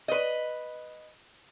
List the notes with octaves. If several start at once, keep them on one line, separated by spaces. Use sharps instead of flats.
B4 D#5